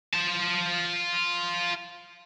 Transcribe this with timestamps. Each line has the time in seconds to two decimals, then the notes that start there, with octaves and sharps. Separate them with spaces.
0.13 F4 A5